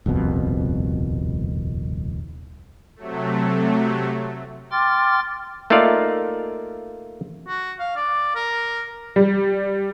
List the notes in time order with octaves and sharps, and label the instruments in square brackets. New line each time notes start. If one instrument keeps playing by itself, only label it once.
[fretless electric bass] D#1 C2 F2 B2
[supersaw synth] C3 F#3 A3
[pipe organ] G5 C6 D6 F6 A6
[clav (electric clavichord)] A3 A#3 D#4 F4 D5 F5
[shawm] F#4
F5
D5
A#4
[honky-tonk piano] G3